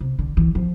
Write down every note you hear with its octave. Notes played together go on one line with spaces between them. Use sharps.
C3
D3
E3
F3